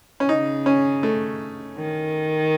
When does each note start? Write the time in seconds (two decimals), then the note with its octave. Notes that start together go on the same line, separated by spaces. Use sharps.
0.20 C#4
0.29 C#3 D#4
0.66 C#4
1.03 A3
1.77 D#3